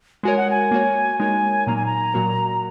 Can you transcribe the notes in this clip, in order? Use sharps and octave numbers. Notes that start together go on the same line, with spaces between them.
G#3 F#4 A#4 C#5 G#5
F#5
G#5
A#3 F#4 C#5
G#3 D#4 A#4 C#5 G#5
A#2 F#3 A#3 D#4 A#5
G#5
A#5
A#2 F#3 A#3 F#4 A#4